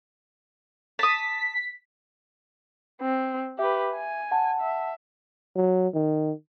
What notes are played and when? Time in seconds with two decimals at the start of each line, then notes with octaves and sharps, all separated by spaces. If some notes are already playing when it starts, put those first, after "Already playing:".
0.99 A5 D#6 B6
3.01 C4
3.59 G4 B4 E5
3.95 G#5
4.31 F#5 A5
4.61 E5
5.56 F#3
5.94 D#3